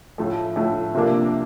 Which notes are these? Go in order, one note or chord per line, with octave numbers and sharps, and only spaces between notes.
A2 F3 A3
A2 F3 A3
C3 F3 A#3 D4